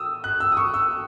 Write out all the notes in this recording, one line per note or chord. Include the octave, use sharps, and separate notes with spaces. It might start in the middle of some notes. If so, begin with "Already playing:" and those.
Already playing: D#6 E6
F#6
E6
D#6
C#6
E6